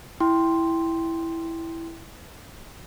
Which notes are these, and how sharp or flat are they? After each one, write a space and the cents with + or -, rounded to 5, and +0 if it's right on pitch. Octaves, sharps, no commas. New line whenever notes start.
E4 +0 G5 +0 C6 +0